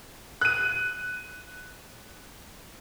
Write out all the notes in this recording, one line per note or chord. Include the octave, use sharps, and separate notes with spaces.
F#6 D#7